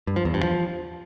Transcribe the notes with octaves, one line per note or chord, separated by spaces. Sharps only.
G2
F3
E2
G2
F3